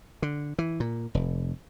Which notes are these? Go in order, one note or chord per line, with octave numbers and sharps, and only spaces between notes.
D3
E3
A#2
F1